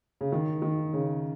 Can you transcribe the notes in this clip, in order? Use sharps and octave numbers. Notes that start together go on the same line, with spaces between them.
C#3
D#3
D#3
C#3